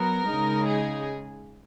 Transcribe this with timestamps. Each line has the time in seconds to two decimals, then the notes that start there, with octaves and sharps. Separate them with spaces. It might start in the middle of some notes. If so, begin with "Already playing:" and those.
Already playing: F#3 B3 A#4
0.26 C#3 G#3 D#4
0.65 G#4